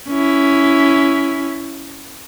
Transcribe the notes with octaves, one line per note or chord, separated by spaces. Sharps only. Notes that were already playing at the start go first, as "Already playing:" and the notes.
C#4 E4